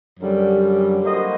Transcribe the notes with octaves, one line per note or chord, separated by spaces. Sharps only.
F#2 D3 G3
G3 A#3 F#4 C5 D#5